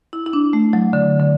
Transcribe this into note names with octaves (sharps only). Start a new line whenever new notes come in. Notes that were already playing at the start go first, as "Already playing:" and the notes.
E4
E4
D4
A3
F#3
D3
D3